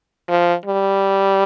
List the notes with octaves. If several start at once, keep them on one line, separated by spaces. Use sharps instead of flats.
F3
G3